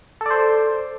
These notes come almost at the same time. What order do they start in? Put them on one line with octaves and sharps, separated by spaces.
A4 D5 C5